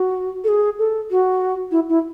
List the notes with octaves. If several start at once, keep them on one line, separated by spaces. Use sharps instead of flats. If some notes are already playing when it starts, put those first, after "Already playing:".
Already playing: F#4
A4
G#4
A4
F#4
E4
E4